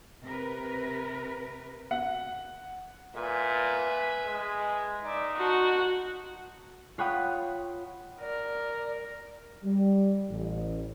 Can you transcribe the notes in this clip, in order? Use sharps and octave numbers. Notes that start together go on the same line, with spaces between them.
C3 A#4 B4
F#5
A#2 B4 E5 G#5
G#3
D#4 D5 E5
F#4 F#5 A5 C6
F4 C#5 F#5 G5 B5 D#6
A#4 D5
G3
A1